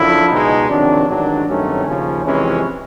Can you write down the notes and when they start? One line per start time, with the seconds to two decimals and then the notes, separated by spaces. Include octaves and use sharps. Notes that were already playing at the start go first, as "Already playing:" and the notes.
Already playing: F#2 D3 F3 E4
0.29 C#2 B2 G#3 D#4
0.68 F2 C3 D#3 F#3 D4
1.08 A1 G#2 D#3 F#3 D4
1.48 G2 D#3 F#3 A3 C4 C#4
1.86 D#2 C#3 F3 C#4
2.25 F2 C3 E3 G#3 C#4